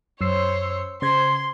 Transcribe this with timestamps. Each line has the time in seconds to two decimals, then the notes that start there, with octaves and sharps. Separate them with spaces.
0.21 F#2 C5 C#5 E6 C7
1.02 C#3 C5 C6 G#6